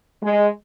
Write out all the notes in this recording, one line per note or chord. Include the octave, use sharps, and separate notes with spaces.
G#3